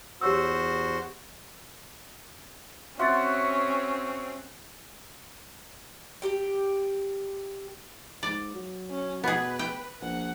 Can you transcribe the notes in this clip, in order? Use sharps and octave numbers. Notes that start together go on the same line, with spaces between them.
E2 F#4 G4 C5 C#5 E6
C4 C#4 F#4 E5 F#5 C6 A6
G4 G5
G#2 D5
F#3
C#4
B2 B3 G#4 B4
G5
A#1 F#5